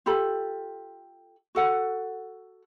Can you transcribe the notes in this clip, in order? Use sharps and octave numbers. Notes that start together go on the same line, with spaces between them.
F4 G4 A4 B5
F#4 A4 F#5